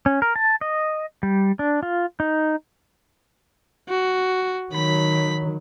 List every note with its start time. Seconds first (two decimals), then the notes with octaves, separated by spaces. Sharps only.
0.06 C#4
0.22 A#4
0.36 A5
0.61 D#5
1.23 G3
1.59 D4
1.83 F4
2.20 D#4
3.89 F#4
4.73 D#3 F#3 B5 B6